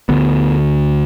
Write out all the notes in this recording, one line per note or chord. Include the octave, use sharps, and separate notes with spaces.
D2 D3 B3